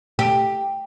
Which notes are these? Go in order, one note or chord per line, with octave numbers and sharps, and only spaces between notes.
G4